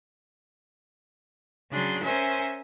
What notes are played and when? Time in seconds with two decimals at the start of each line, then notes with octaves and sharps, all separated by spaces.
1.71 C#3 F#3 D4 G#4 C6
2.02 C#4 A#4 C5 E5 G#5